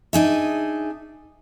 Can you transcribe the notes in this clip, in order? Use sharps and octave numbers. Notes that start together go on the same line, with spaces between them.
D4 D#4 G#4 E5